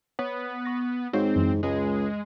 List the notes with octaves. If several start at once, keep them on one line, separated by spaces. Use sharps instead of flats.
B3 C#5
C#6 F#6 A#6
G#2 C4 F#4 C#5 F5
F#2 E3
C#2 G#3